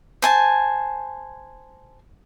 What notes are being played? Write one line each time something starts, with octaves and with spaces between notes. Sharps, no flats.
C5 G#5 A5